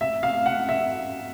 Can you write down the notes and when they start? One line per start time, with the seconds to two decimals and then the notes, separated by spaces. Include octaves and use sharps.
0.01 E5
0.23 F5
0.46 F#5
0.69 E5